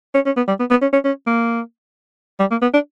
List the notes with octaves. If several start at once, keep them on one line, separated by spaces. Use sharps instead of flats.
C#4
C#4
B3
G3
B3
B3
C#4
C#4
C#4
A#3
G3
A#3
B3
D4